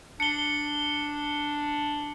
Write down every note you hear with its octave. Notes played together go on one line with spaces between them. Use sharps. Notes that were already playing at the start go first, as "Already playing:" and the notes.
D4 C#7 G7